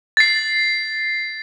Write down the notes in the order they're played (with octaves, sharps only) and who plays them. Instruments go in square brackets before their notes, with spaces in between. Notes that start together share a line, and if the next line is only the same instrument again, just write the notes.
[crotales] A6 C7